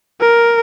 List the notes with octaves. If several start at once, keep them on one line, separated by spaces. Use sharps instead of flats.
A#4